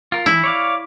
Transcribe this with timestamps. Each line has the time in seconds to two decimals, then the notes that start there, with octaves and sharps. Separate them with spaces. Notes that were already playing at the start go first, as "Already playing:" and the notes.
0.12 F4 A#4
0.26 E3 E4
0.44 C#5 D5 F5